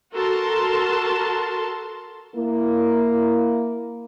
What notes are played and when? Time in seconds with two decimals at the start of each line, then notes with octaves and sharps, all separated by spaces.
0.14 F#4 A4 A#4 A5 C6
2.36 A#3 E4